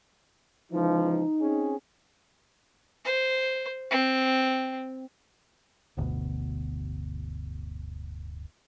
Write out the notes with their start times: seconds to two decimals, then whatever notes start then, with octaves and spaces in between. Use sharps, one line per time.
0.73 C#2 E3 F3 D#4
1.41 C4 C#4 G#4
3.05 C5
3.91 C4
5.97 D1 G1 D2 B2